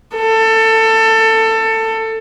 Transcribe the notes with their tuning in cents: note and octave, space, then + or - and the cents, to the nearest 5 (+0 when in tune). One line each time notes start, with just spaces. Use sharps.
A4 +20